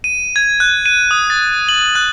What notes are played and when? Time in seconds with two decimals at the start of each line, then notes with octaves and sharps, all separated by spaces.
0.04 D#7
0.36 G#6
0.60 F#6
0.86 D#7
1.11 D#6
1.30 A6
1.69 F#7
1.95 F#6